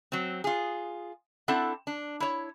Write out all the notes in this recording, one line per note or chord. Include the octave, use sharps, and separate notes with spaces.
F#3 C4
F4 G#4
C4 D4 E4 A4 F#5
D4
E4 C#5